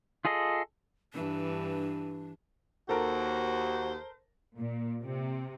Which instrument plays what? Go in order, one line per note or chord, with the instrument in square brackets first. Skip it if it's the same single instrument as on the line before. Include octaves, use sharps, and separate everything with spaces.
[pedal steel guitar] F4 G#4 A4 D#5
[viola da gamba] G2 E3 [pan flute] D4
[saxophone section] D#2 [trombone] F#4 [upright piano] A4 A#4 [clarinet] C5
[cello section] A#2
C3